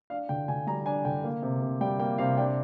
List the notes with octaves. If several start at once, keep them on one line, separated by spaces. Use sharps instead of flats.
D4 F5
D3 G5
D3 G#5
G3 A#5
D4 G#5
D3 G5
A#3
C3
C3
G3 G5
A#3 G5
C3 F5
D4 G5